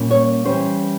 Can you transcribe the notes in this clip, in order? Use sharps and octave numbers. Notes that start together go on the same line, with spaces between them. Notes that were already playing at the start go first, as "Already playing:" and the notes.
Already playing: A#2 G3 A#3 C#4
C#5
E3 G3 C#4 C5